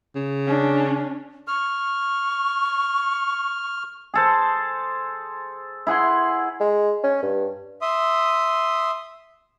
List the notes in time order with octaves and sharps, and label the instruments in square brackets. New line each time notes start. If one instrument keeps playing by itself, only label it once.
[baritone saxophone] C#3
[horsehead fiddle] C#4 D4
[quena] C#6 [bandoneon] F6
[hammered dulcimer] G#4 A4 C5
E4 G#4 F#5 C6
[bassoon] G#3
C#4
G2
[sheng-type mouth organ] E5 C6 D#6